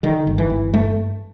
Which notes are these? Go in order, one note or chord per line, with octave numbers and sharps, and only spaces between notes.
D3 D#3
G1
E3
G1
G2 A3